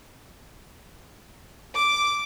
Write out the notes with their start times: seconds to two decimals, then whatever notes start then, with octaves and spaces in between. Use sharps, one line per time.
1.74 D6